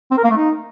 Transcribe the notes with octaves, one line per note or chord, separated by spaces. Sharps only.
C4
A#4
A#3
A3
D#4